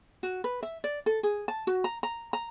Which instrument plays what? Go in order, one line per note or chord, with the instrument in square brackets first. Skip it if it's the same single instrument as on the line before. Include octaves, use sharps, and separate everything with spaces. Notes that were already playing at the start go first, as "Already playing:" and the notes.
[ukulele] F#4
B4
E5
D5
A4
G#4
A5
F#4
A#5
A#5
A#5